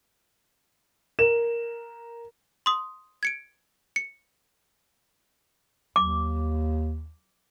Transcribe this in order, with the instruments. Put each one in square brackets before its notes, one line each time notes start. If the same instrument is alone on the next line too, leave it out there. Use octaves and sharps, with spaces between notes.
[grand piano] A#4 E7
[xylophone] C6 D#6
G#6 C#7 D7
C#7
[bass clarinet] D#2 [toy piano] D6